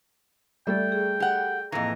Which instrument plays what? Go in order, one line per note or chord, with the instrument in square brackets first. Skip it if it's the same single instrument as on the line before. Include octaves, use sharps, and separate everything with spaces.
[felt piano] G3 A3 [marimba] A4 D5 E5 [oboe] G5
[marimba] G#4
[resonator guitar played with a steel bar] G4 F#5
[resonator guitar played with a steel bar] F2 E3 [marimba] A2 A#3 D#5 [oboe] A#5